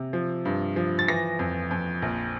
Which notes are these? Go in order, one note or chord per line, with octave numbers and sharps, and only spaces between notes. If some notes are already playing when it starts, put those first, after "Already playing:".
Already playing: C3
F3
G2
F3
A6
E3 A#6
F2
F2
A#1